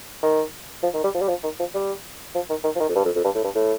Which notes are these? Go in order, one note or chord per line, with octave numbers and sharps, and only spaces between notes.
D#3
F3
D#3
G3
F3
G3
F3
D#3
F3
G3
F3
D#3
D#3
F3
D#3
F2
G2
F2
F2
G2
A2
G2
A2